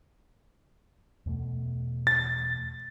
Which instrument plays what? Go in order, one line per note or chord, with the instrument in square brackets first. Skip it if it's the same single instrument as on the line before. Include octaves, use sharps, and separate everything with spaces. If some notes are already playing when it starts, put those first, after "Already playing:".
[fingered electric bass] E2 B2 A3
[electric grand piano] A6